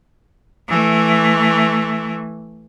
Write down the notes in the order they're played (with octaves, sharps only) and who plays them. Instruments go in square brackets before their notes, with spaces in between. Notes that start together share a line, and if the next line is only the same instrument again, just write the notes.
[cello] E3 A3